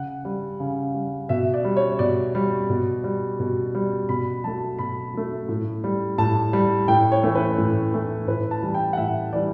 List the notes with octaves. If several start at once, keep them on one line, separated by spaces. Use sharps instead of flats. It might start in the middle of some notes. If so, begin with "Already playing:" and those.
Already playing: C#3 F#5
G3
C#3
G3
B2 E5
D5
G3
C#5
B2 D5
G3
B2
G3
B2
G3
B2 B5
F#3 A3 A5
B2 B5
F#3 A3
A2
G3
A2 A5
G3
A2 G5
C#5
E3 A3
B4
A2
E3 A3
A2 B4
A5
E3 G3
G5
F#5
A2 E5
E3 G3 D5